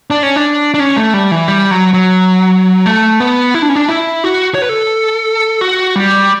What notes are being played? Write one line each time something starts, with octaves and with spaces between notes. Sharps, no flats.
D4
C#4
D4
D4
C#4
A3
G3
E3
G3
F#3
F#3
A3
B3
E4
D4
C#4
D4
E4
F#4
C#5
B4
A4
F#4
G3